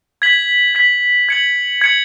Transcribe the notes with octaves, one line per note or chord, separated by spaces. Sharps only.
G#6 B6 F#7
G#6 B6 F#7
G#6 C#7 F#7
G#6 C#7 F#7